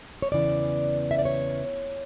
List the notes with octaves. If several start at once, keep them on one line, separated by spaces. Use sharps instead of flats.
C#5
E2 C#3 E3 D5
E5
D5
C#5